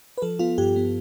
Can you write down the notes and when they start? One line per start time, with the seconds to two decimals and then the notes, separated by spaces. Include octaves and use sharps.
0.18 B4
0.22 F3 A4
0.39 B3 F4
0.58 G2 G4
0.76 B3